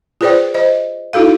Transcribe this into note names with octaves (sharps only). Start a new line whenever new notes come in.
F4 G#4 B4 C5 D5 G5
C5 D#5
D#4 E4 F#4 A4 F5